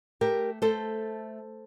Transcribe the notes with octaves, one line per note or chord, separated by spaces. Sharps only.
A3 G4 A#4
A3 A4 C5